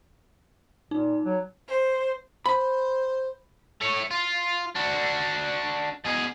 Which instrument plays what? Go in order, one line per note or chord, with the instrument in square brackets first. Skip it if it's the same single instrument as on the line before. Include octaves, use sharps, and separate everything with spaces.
[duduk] A#2 [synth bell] D#4
[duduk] F#3
[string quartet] C5
[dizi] C5 [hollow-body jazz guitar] B5
[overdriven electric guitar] A3 C#5
F4
D4 F#4
B2 G#4